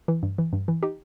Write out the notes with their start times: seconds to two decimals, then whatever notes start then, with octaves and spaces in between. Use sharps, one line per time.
0.08 E3
0.23 G2
0.38 E3
0.53 G2
0.68 E3
0.83 D#4 G4